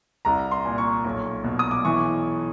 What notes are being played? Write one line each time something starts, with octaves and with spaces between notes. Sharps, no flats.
C2 A#5
C6
A#2
C#6
B1
B2
D#6
D6
E3 C#6